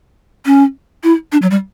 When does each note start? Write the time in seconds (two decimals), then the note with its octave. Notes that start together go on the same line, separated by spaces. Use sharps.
0.46 C#4
1.03 E4
1.32 D4
1.42 F#3
1.51 G3